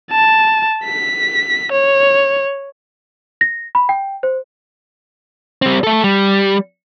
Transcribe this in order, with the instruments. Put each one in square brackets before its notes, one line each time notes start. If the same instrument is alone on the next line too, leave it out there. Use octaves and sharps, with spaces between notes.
[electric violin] A5
B6
C#5
[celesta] A#6
B5
G5
C5
[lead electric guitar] G3 C4
A3 A4
G3